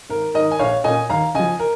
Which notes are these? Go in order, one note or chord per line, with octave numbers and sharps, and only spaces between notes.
G#1 A#4
G#2 D#3 A#4 D#5
G#5
A#1 C#5 F5
A#2 A#3 C#4 D#5 G#5
D#2 F5 A#5
C#3 F3 D#5 G#5
A#4